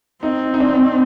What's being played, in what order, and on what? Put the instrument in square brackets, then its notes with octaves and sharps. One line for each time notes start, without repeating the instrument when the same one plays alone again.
[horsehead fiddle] C4 [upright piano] D#4
[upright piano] D#4
D4